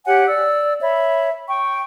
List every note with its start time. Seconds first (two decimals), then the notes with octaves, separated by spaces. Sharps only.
0.06 G4 C#5 F#5 G#5
0.27 D5 E6
0.81 C#5 E5 B5
1.48 G5 C#6